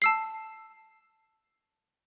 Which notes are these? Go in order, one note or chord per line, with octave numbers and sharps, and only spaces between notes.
A5 E6 C7